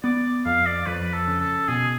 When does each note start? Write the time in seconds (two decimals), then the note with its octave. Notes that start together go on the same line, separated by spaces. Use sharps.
0.04 B3 D5
0.45 F2 F5
0.66 D5
0.86 F2 B4
1.13 A4
1.27 C#3
1.41 A4
1.68 B2 G#4